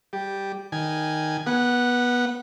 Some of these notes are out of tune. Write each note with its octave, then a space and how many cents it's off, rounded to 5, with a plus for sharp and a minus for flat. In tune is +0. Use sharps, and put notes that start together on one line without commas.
G3 +0 G4 +0
D#3 +0 G#5 +0
B3 -20 F#5 +0